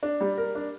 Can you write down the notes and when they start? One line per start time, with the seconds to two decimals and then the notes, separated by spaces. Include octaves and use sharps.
0.03 D4
0.21 G3
0.37 A#4
0.55 D4